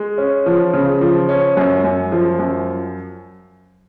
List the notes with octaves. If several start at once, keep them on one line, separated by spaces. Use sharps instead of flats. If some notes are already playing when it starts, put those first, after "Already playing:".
Already playing: G#3
C#4
F3
C#3
F3
C#4
F#2
F#2
F3
F#2